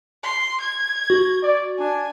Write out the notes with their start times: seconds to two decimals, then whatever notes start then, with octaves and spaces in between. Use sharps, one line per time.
0.23 C6
0.60 G#6
1.10 F#4
1.43 D5
1.79 D4 G#5